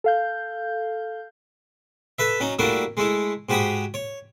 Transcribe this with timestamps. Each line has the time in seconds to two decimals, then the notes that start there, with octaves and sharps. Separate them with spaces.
0.04 A4 F5 G6
2.19 A4 B4 E5
2.40 F#3 C#4 D#4
2.59 G3 A3 A#3 D4 E4 F#4
2.97 G#3 A3 E4
3.49 G#2 F#4 G4 G#5 B5 D#6
3.94 C#5